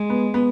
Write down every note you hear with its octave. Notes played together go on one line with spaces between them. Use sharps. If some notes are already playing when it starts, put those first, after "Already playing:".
Already playing: G#3
B3
B3